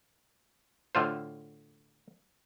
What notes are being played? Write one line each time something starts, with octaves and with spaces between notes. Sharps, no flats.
A2 D3 F4 C5